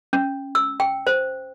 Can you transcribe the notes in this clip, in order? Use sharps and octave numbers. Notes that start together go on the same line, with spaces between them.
C#4
E6
G5
C5